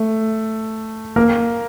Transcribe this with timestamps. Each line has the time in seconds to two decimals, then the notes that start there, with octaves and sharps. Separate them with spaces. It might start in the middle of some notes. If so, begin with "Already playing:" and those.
Already playing: A3
1.16 A#3 A#4